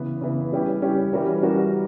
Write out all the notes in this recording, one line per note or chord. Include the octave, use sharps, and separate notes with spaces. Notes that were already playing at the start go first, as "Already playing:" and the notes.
Already playing: C#3 E3 B3
C#3 E3 B3
G3 C#4 E4 G4
G3 C#4 E4 G4
E3 G3 C#4 F#4 A#4
E3 G3 C#4 F#4 A#4